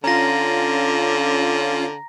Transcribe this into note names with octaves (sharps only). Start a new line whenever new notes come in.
D3 C#4 F4 A#5 A#6